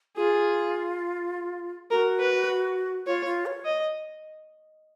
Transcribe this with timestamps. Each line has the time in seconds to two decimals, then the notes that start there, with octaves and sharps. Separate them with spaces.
0.17 F4 G#4
1.91 F#4 A#4
2.20 B4
3.07 F4 C#5
3.26 F4
3.46 C#5
3.65 D#5